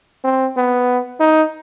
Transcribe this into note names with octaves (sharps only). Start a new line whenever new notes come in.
C4
B3
D#4